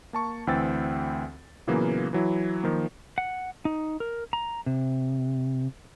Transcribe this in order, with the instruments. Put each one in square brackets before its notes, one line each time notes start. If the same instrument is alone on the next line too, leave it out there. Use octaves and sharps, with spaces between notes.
[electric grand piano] A#3 A5 C#6
D2 E3 C4 G5 E6 A6
A#2 C#3 E3 F#3 A#3 B3
E3 F#3 E4
D#3 F3 A#3
[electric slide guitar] F#5
D#4
A#4
A#5
C3